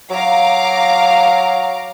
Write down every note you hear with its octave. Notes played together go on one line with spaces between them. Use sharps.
F#3 F5 A#5 D6